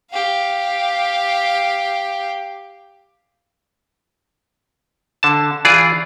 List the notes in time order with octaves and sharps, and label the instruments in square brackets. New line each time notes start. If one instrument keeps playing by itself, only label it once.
[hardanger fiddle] G4 F5
[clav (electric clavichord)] D3 A5
E3 F4 G#4 D5